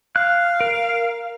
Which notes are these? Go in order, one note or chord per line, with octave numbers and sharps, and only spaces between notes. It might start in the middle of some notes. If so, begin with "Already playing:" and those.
F5 F#6
A#4